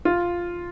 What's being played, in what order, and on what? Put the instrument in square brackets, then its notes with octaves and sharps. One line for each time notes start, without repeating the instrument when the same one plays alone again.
[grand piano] F4